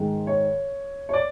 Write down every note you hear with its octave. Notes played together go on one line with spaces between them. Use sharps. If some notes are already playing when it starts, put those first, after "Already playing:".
Already playing: G#2 D#3 G#3
C#5
C#5
D5